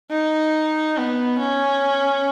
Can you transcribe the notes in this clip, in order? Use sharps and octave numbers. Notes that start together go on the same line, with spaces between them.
D#4
B3
C#4